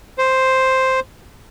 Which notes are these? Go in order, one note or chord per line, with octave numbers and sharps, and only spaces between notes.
C5